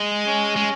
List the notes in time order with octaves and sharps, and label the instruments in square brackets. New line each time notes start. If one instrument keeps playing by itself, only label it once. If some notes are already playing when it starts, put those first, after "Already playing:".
Already playing: [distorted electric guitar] G#3
[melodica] C#4
[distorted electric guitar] G#3